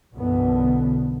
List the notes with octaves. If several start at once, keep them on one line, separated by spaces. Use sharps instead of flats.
B1 F#2 B2 D3 E3 B3